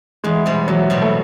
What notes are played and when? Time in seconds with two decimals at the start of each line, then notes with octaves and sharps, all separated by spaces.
0.24 E2 G#3
0.46 B2 G3 C4
0.67 E2 F#3
0.90 B2 G3 C4
1.01 A3